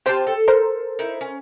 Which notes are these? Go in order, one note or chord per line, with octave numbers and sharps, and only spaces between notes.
C4 F4 G4 C5 G5 A5
A4
A#4 C5
D#4 E4
C#4